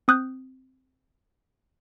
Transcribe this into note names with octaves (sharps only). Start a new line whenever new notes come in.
C4 D#6 F#6 G6